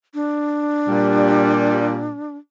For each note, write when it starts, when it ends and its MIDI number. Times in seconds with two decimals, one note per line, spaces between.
0.14 2.36 62
0.87 2.14 46
0.87 2.14 55